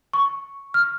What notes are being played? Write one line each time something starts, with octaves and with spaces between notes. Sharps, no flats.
C#6
F6